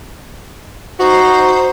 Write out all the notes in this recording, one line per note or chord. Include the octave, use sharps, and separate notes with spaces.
D#4 F#4 C5